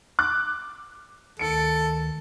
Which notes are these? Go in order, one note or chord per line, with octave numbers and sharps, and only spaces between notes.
D6 F#6
D2 D#3 A4 C#7 D7